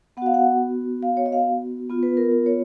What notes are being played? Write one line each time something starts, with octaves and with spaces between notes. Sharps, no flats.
B3 F#5
F#4 F5
F#5
F5
C#5
D#5
F5
B3 F4
B4
A#4
A#4
C#5